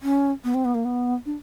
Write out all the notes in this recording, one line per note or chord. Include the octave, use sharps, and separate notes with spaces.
C#4
B3
C4
B3
A#3
B3
D4